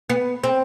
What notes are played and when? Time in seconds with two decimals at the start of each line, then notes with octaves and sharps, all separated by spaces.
0.10 B3
0.44 C4